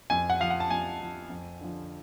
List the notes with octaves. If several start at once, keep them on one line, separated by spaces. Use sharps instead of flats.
F2 G#5
F#5
F3 F5
F#5
A5
F2 G#5
F3
F2
D3 F3